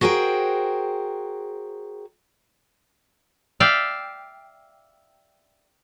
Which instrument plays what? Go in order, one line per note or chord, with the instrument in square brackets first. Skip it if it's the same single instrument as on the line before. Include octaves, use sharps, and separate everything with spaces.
[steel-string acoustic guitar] F#4 G#4 A#4 C5 G5
[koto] D5 E5 F5 G5